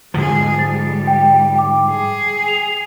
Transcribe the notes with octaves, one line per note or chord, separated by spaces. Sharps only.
G#2 D3 F3 G#3 G#4
G3 A6
G5
G5 D6
G#4
F7